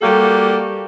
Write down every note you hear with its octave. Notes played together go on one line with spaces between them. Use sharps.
G3 A#3 F#4 G4 A4